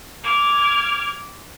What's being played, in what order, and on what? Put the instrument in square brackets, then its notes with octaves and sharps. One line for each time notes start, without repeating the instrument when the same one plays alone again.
[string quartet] D6 F6 G#6